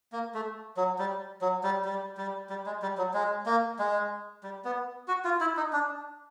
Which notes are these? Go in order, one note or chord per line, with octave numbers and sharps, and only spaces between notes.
A#3
A3
F#3
G3
F#3
G3
G3
G3
G3
G#3
G3
F#3
G#3
A#3
G#3
G3
B3
F#4
F4
E4
D#4
D4